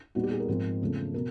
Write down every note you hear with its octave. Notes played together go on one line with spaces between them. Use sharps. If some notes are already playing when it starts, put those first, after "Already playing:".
A#2 G3 B3 D#4 F#4
G4
G#4
A#4
G#2 F3 G#3 C4
E2 C#3 F3 A3
B2 A#4